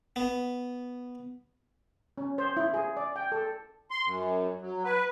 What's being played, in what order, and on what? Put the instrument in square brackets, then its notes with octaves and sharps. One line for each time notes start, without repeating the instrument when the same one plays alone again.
[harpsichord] B3
[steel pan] C#4
C5
E4
G#4
D5
G5
A4
[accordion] C6
F#2
F#3
B4